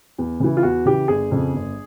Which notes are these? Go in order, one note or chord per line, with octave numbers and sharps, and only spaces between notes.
E2
C#3 E3
F4
E2 F#4
C#3 E3 G4
G1 G#4
F2 C#3
G1